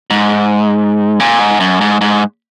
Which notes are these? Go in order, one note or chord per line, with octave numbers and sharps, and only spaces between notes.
G#2
A#2
G#2
F#2
G#2
G#2